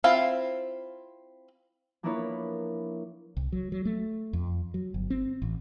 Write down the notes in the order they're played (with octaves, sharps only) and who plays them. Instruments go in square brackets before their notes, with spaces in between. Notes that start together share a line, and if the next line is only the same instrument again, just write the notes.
[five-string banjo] C4 E4 F4 F5
[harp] F3 A#3 D4 E4 B4 C#5
[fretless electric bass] C2
F#3
F#3
A3
F2
F#3
G1
C4
A1